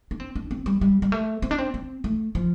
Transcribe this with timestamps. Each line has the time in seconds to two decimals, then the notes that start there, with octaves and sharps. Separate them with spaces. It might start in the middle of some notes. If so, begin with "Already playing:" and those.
0.11 D4
0.20 C4
0.36 D4
0.51 C4
0.66 G3
0.81 G3
1.02 G3
1.12 A3
1.42 C4
1.51 D4
1.58 C4
1.74 C4
2.04 A3
2.35 F3